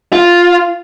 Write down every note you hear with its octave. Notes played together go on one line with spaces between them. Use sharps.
F4